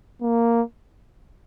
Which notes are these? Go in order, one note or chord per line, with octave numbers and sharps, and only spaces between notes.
A#3